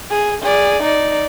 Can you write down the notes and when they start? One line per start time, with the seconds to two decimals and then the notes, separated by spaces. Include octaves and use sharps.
0.11 G#4
0.43 G#4 D5
0.83 D#4 D5